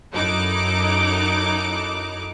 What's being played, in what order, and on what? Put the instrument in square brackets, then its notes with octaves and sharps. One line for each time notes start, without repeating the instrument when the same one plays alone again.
[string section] F#2 D#4 E4 A4 D6 F#6